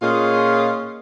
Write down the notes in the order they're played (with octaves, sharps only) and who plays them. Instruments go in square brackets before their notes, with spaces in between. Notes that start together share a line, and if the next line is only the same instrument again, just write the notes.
[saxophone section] A#2 C#4 F4 G#4 D#5